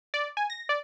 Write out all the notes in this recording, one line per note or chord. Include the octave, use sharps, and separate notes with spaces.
D5
G#5
A#6
D5